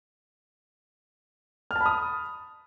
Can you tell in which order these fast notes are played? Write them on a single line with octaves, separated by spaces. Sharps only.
F6 A5 B5 D#6